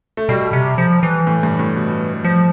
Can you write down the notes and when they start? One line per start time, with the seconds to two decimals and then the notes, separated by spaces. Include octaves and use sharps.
0.17 A3
0.29 B2 G3
0.53 C3
0.78 F3
1.03 E3
1.27 A2
1.43 G2
1.59 A2
1.76 B2
2.24 F3